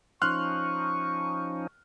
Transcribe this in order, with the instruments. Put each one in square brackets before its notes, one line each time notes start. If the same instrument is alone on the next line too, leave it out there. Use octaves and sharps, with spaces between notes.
[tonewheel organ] F3 C#4 D#4 [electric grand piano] C6 F6 F#6 [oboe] C#6